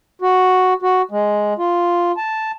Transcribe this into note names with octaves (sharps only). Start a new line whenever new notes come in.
F#4
F#4
G#3
F4
A5